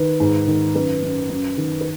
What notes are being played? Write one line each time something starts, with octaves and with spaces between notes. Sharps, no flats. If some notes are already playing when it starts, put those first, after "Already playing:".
Already playing: D#3 B4
G#2
D#3
F#2 B4
F#2
F#2
D#3
B4